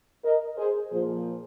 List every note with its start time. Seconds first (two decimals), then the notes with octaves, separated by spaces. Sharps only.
0.24 A#4 D#5
0.57 G#4 C5
0.91 A#2 F3 G#4 C5